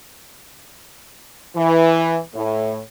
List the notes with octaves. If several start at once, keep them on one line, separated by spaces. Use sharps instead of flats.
E3
A2